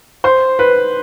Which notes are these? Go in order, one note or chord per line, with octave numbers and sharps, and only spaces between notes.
C5
B4